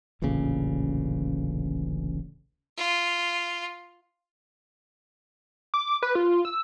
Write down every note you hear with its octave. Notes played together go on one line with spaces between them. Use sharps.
D1 A1 A#2 C#3
F4
D6
D6
B4
F4
E6